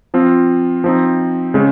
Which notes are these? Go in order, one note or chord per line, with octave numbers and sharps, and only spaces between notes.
F3 C4 F4
F3 C4 D#4
C#3 G#3 C#4